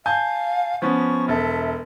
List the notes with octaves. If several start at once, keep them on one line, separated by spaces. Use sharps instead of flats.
F5 G#5 A5 G6
F3 B3 C#4 C#6
E1 A4 E5